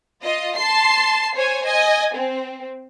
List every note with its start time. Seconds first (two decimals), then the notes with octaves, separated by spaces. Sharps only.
0.22 F4 D#5
0.57 A5 C6 C7
1.35 C5 C#5 G#5
1.65 D#5 G#5
2.15 C4